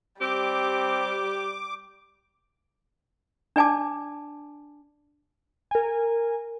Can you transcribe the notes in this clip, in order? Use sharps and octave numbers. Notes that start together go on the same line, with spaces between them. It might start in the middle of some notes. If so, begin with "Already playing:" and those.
G3 C4 G4 D6
D4 D5 G#5 A5 D6
A#4 G#5